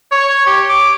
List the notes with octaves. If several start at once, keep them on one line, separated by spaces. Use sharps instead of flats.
C#5
G4
D6